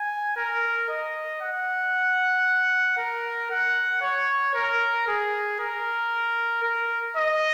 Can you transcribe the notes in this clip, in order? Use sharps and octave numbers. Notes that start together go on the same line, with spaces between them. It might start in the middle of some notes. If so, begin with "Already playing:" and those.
Already playing: G#5
A#4
D#5
F#5
A#4
F#5
C#5
A#4
G#4
A#4
A#4
D#5